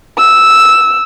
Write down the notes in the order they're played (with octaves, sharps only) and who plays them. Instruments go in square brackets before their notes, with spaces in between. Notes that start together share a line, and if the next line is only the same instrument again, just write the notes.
[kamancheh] E6